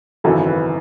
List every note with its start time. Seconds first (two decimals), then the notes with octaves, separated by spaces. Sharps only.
0.24 G#1 F#2 C#3 E3 A4
0.47 B4